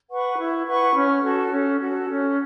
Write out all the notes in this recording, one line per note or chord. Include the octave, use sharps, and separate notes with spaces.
B4 F#5 C#6
E4
B4 F#5 C#6
C#4
F#4 A4
C#4
F#4 A4
C#4